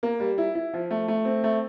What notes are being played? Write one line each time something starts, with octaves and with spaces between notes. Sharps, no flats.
A#3
G3
E4
E4
F3
A3
A3
C4
A3